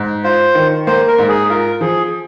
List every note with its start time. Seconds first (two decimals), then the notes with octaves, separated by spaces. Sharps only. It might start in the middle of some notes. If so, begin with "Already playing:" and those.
Already playing: G#2
0.24 F4 C5
0.55 D#3
0.87 A#3 C5
1.08 A#4
1.19 G#2
1.29 G#4
1.50 F4 A#4
1.81 F3 G#4